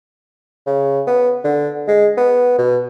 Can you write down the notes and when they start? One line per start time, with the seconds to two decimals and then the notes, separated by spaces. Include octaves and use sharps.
0.67 C#3
1.07 B3
1.45 D3
1.88 G#3
2.18 B3
2.59 B2